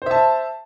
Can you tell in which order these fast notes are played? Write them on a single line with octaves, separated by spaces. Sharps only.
C5 E5 A5